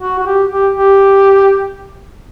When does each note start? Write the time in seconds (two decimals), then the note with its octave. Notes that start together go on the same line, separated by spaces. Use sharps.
0.01 F#4
0.19 F#4
0.26 G4
0.51 G4
0.75 G4